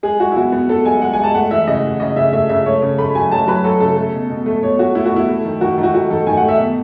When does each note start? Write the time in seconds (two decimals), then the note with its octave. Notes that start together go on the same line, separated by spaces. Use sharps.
0.03 G#3 G#4
0.19 G#3 F#4
0.32 E4
0.36 B3 F#4
0.52 B3
0.69 B3 A4
0.85 G#3 G#5
1.02 G#3 F#5
1.13 G#5
1.18 G#3
1.24 A5
1.35 A3 F#5
1.51 E3 E5
1.67 C#3 D#5
1.84 E3
2.00 C#3 D#5
2.16 C#3 E5
2.32 A3 E5
2.49 C#3 E5
2.66 A3 C#5
2.82 C#3
2.98 A3 B5
3.15 F#3 G#5
3.31 F#3 A5
3.47 F#3 B4
3.64 F#3 A4
3.80 C#3 A4
3.97 A3
4.13 B2
4.30 B2
4.46 A3
4.63 B2 C#5
4.79 A3 F#4
4.95 A3 E4
5.05 F#4
5.12 B2 E4
5.28 A3
5.45 D#3
5.61 D#3 F#4
5.78 D#3
5.83 F#4
5.94 A3 F#4
6.10 D#3 A4
6.26 D#3 G#5
6.37 F#5
6.42 A3
6.49 E5
6.59 B2